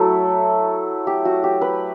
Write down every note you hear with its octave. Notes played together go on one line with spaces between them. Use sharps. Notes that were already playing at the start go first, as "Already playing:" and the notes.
Already playing: F#3 A3 E4 A4
G4
F#4
G4
B4